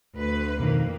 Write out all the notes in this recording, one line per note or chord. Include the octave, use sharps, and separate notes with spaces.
D2 B4
F2 B2 D#3 A#3